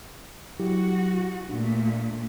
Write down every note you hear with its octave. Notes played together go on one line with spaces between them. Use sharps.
F#3 E4 F#4 G4
A#2 A3 D4